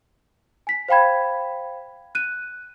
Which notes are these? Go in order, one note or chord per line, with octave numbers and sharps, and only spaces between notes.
G#5 B6
C5 F5 G5 B5 G#6
F#6 D#7